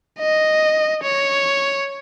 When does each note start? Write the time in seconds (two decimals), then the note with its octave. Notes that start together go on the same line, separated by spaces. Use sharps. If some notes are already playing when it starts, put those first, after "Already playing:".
0.20 D#5
1.03 C#5